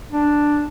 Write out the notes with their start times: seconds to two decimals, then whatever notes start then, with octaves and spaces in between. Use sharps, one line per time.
0.12 D4